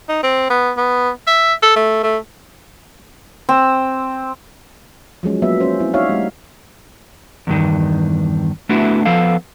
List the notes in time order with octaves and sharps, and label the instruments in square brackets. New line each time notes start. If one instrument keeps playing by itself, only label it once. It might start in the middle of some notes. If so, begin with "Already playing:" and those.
[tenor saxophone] D#4
C4
B3
B3
E5
A4
A3
A3
[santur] C4 E6
[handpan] F3 F#3 G#3 C#4
F#3 A#3 B3 E5
C#4 C5
C4 E4
D#4 F#4 C#5 D5 E5 F5
G3 A3
[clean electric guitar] E2 G2 D#3
A3 B3 D4 E4 F#4
F3 B3 A4 F5